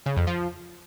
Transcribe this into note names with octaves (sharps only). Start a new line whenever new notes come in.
C#3
F2
F3